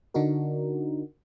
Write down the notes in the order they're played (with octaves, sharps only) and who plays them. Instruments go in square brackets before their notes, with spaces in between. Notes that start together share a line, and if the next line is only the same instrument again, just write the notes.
[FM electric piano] D3 D4 D#4 F#4 A#4